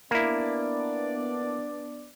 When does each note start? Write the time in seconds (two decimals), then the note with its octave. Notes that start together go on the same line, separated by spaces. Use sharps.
0.11 A#3 B3 D4 E4 D5